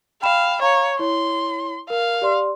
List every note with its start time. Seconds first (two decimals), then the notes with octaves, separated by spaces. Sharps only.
0.22 F5 G5 B5 E7
0.62 C#5 F5 A#5
0.99 E4 C#5 C6
1.90 A#4 F5
2.22 G4 D5 C6